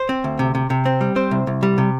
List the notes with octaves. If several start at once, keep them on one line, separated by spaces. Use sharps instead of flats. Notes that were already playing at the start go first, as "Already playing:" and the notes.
Already playing: C5
C4
D2
C3
C3
C3
C4
G3
C4 C5
C2
C2
G3
C3